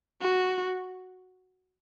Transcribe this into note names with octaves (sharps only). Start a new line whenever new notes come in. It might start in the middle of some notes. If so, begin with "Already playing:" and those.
F#4